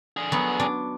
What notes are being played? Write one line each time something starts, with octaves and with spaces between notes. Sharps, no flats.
D3 G#4
F#3 B3
D4